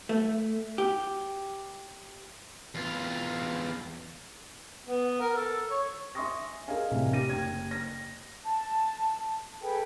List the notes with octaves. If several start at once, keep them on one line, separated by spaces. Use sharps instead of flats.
A3
G4
E2 F4
B3
A#4
A4
C#5
E5 G#5 C6 C#6 D#6 A#6
G#4 A#4 D#5 F5 G#5
A1 C3
G4 A#6 D#7
F#1 G5 G#6
A#6
A5
G#4 A4 B4 G5